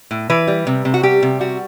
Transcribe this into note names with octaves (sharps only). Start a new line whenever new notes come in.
A2
E3 B4
G3
C3
C3
F#4
G3 G4
C3
G3 F#4